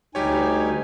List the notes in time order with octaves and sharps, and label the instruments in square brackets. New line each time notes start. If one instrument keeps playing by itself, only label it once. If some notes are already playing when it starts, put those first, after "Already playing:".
[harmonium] D2 D#4 G#5 [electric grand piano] G3 G4 C#5